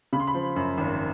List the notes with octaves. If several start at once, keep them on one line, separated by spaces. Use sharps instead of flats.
C#3 B5
C6
B5
F3
F#2
G#1